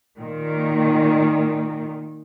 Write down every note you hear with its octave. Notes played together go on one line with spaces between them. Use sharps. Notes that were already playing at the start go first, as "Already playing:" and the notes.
A#2 D#3